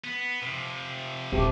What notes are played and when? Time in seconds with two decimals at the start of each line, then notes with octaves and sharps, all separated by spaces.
0.04 B3
0.42 C3 F3
1.32 D#1 A3 C4 G4 A5 D6